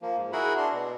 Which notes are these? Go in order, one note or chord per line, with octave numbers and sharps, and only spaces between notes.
F3 A#3
G#2
E4 F#4 G#4 A#4 F#5 B5
D4 C6
B2